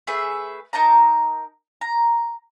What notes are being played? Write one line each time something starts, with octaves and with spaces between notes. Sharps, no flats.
A3 G#4 B4 E5
D#4 A#4 A5 A#5
A#5